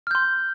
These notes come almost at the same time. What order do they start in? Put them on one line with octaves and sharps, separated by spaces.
F6 G6 C6